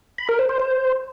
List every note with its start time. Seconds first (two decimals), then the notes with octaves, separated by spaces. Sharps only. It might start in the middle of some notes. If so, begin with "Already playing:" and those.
0.18 B5
0.29 A#4
0.39 C5
0.49 C5
0.60 C5